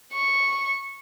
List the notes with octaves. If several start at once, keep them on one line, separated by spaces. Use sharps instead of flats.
C#6